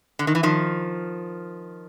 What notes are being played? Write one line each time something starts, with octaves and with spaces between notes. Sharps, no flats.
D3
D#3
E3
D#3 F3